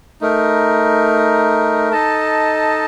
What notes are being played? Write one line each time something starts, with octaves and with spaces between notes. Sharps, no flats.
A3 D#4 A#4
D#4 A4 D#5 A5